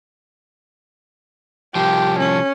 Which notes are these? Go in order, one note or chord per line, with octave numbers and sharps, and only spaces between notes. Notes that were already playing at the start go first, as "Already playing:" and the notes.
C2 F3 G4
C#4